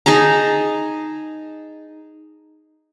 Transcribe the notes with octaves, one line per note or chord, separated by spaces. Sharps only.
D#4 G#4 A5 A#5